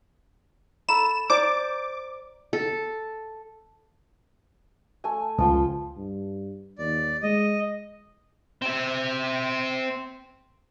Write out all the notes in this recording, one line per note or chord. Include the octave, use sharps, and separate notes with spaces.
A4 A#5 B5 E7
C5 D5 A#5 D6
A4
A3 G#5
C#2 F3 F4 G5
G2
D#2 D5
G#3 D#5
C4 E5